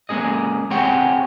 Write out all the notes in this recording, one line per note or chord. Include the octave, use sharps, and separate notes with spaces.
G#3 A#3 C#4 G#4 D#5
C4 G4 G#4 C#5 F#5 G5